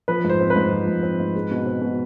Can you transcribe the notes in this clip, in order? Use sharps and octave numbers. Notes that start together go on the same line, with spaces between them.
F3 B4
G#2
C5
C4
B4
G#2
F3
G#2
C4
G#2
G#3
B2
C4
B2